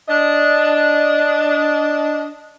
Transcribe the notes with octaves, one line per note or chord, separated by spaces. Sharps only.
D4 D#5